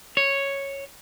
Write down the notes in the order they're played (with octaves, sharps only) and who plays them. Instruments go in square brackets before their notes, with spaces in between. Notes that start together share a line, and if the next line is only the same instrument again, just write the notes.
[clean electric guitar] C#5